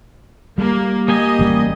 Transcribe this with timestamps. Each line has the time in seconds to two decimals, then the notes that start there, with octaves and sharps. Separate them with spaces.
0.58 G3 A#3
1.08 A#3 G4 D#5 G#5
1.39 A1 G3